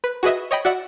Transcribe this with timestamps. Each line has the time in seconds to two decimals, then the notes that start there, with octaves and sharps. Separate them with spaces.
0.04 B4
0.23 F#4 G#4 B4 D#5 E5
0.51 C#5 D#5 G5 B5
0.65 F#4 D5 E5 F#5